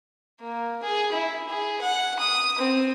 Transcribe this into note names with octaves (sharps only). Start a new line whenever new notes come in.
A#3
G#4
E4
G#4
F#5
D#6
C4